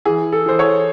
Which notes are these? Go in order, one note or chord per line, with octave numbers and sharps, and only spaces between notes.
E3 G#4
A4
E3 C5
C#5